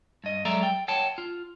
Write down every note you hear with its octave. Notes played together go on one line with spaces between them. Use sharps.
G2 D#5
F#3 G#3 A4 D5 E5 A#5
G5
C#5 F#5 G5 A5
F4